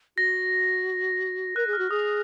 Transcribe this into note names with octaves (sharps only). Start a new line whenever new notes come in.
F#4 A#6
A#4 F#6
G#4
F6
F#4
G#4 D#6